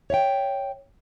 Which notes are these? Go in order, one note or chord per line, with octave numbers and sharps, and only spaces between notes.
C#5 E5 F#5 G5